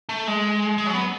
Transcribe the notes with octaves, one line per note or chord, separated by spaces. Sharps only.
A3
G#3
G#3
F#3
B3